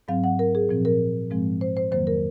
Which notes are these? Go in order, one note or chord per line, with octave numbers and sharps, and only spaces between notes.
G#2 F#3 C4 F5
F#5
A#4
G#4
A#2 F3 C4
A#4
G#2 F3 G#3 C4
C5
C5
F2 D#3 F#3 A#3 C5
A#4